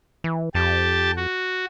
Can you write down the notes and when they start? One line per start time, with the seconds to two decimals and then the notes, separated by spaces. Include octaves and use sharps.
0.24 E3
0.55 F2 G4 A5
1.17 F#4